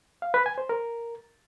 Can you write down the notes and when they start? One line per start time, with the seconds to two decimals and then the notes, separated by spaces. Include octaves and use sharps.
0.22 F5
0.34 B4
0.46 G#5
0.58 C5
0.69 A#4